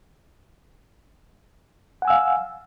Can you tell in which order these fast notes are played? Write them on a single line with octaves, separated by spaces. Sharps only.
F#5 G#5 E6 F5